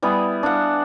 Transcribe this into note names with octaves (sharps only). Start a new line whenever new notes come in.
G3 B3 E4 G#4
D4 F5 F#5